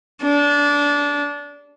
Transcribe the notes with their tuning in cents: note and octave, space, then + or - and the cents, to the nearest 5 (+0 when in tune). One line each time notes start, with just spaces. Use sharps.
D4 -20